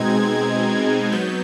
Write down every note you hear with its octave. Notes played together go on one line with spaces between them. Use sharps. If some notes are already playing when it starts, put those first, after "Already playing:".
Already playing: B2 G#3 C4 D#4 G#6
F#3 B3 G6